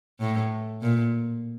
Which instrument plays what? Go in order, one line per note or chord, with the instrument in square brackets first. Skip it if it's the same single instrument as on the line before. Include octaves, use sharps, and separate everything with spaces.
[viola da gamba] A2
A#2